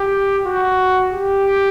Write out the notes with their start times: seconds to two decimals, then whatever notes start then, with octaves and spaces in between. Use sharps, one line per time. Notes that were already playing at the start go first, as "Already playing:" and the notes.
Already playing: G4
0.46 F#4
1.11 G4